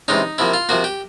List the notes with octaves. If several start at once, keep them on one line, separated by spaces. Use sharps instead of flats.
C3 E3 G#3 C#4 D#4
C3 F3 A#3 E4
F4
C3 F3 A#3 F#4
G4